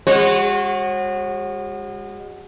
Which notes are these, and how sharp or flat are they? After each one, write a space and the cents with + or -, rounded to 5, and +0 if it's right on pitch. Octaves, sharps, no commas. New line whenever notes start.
G#3 -35 F#4 +0 C#5 -40